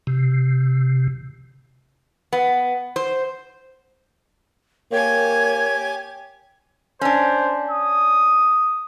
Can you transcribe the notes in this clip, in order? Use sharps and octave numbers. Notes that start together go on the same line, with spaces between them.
C3
B3
C5
A#3 G4 C#5 G#5
C#4 D4 C5
D#6